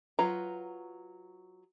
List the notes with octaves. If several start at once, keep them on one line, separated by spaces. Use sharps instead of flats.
F#3 F4 B4 A#5